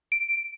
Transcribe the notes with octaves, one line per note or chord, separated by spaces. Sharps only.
D7